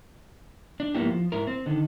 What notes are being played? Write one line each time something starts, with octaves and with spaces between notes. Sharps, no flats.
D4
G#2 F3 A#3 B3 E4 G4
F3
G#2 E4 A#4
C4
D3 D#3